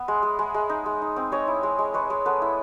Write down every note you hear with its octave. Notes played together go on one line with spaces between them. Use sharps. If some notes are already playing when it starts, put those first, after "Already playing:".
Already playing: B3 E5
G#3
G#3
G#3
G#3
D#4
G#3
D#4
C4
G#3 C#5 D#5
E4
G#3
G#3
G#3 B4 C#5
G#3
B3 A4 B4
E4